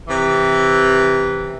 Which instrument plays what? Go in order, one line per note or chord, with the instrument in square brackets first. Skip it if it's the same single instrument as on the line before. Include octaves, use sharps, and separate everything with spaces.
[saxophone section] C3 E3